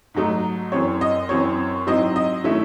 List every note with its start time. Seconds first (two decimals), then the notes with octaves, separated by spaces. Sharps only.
0.14 G#2 F#3 A3 D#4
0.72 F#2 E3 C4 C#5
1.01 D#5
1.29 F#2 E3 C4 C#5
1.87 G#2 F#3 C4 E4 D#5
2.16 D#5
2.44 D#3 A3 C#4 E4 E5